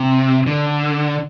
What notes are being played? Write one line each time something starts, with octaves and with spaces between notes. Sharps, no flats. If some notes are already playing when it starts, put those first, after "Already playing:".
Already playing: C3
D3